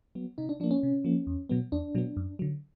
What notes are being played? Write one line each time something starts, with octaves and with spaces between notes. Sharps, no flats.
F#3 B3
C3 D#4
D4
F3 A#3 D4
C#4
C3
F3 A#3
E2
B2 F#3 B3
E2 D4
B2 F#3 B3
F#2
D3 F#3